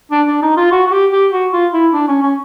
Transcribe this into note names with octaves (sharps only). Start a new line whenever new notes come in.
D4
D4
D#4
F4
F#4
F#4
G4
G4
F#4
F4
E4
D4
C#4
C#4